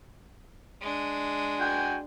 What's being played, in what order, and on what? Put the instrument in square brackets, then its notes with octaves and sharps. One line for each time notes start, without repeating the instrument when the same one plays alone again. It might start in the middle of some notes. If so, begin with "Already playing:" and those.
[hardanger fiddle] G#3 D4
[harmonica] F#4 G5 G#5